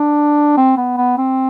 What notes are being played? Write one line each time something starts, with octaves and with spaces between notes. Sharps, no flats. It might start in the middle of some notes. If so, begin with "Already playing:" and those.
Already playing: D4
C4
B3
B3
C4